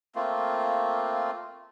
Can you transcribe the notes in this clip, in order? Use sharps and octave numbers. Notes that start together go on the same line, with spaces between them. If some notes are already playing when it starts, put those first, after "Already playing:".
A3 A#3 C4 F4